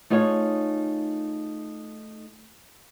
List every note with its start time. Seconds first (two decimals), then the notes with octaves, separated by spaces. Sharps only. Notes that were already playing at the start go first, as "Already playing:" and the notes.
0.10 A3 D#4 F4 G#4 C#5